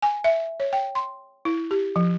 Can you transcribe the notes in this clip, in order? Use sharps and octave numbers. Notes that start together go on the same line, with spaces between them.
G#5
E5
C#5
G5
C6
E4
G4
F3